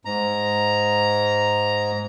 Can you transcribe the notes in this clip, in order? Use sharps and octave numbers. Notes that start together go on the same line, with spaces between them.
G#2 A#5